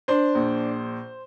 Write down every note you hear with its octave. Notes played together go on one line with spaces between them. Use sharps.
D4 C5 C6
A#1